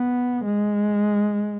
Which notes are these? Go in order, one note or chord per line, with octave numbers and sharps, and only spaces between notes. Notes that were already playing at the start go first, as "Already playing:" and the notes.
Already playing: B3
G#3